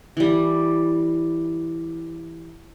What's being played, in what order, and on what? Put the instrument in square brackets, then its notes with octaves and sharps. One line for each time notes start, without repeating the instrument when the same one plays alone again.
[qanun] E3 G3